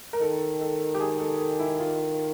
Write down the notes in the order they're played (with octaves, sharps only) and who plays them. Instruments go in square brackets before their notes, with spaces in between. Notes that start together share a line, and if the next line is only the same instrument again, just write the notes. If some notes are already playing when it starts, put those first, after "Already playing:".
[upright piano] A#4
[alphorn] D#3 [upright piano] A4
[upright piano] A4
G4
G#4
A4
A4
E4
F4